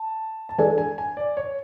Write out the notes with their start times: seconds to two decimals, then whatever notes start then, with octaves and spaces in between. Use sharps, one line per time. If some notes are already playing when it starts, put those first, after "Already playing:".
Already playing: A5
0.49 A5
0.58 E3 G#3 D4 A4 G#5
0.78 G#5
0.98 G#5
1.17 D5
1.37 C#5